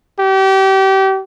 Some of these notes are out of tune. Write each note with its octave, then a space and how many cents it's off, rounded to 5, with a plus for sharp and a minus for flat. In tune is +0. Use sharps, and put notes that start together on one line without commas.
G4 -30